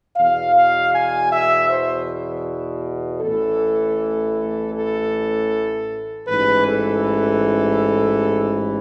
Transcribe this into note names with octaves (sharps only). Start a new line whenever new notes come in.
E2 B2 F5
F5
G#5
E5
C5
A1 A2 E3 A4
A4
A1 G#2 E3 B4
A4